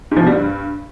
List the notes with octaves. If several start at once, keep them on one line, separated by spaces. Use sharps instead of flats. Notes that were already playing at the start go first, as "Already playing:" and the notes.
G#2
F3
B2
G3
G2